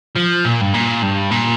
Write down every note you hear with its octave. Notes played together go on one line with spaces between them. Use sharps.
F3
A#2
G2
A#2
G2
A#2